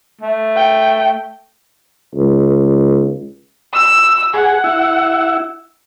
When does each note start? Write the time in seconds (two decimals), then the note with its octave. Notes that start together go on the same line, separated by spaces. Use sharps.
0.21 A3
0.56 G5
2.15 C#2
3.73 E6
4.34 G#4 F#5
4.64 E4